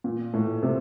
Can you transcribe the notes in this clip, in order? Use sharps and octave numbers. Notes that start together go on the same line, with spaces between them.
A#2
A2
C3